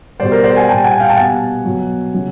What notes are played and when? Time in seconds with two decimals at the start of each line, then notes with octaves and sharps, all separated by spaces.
0.20 B2 G3 C5 D5
0.31 A#4 C5
0.44 C5 D5
0.56 F#5 G#5
0.68 A#2 G3 G5 A5
0.84 F#5 G#5
1.00 F5 G5
1.09 A5
1.17 B2 G3 F#5 G#5
1.65 B2 F#3
2.13 C#3 F#3